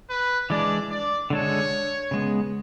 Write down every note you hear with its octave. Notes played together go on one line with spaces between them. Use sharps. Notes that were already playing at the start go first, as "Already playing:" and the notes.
B4
E3 G#3 D4 D5
D5
D3 G#3 D4 A4 C#5
C#3 G#3 B3